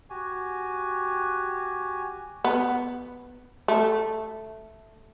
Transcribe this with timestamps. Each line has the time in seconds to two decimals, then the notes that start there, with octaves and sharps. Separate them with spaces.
0.10 F#4 G4 G#5
2.44 B3
3.68 A3